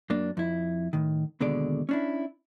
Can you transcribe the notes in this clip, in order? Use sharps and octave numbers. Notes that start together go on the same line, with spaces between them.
F#2 A#3 D4
F2 E4
A2 D#3
D#2 B2 D3 G#3 D5
C#4 D4 E4